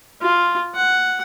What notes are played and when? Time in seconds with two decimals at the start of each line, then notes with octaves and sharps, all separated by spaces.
0.22 F4
0.75 F#5